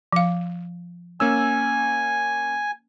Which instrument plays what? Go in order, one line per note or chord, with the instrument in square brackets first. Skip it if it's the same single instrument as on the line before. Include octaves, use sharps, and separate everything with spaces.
[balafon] F3 F5
[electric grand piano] A#3 C#4 E6 [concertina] G#5